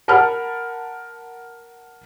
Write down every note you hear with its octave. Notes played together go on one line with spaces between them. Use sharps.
A#4 F#5 A5 B5 F6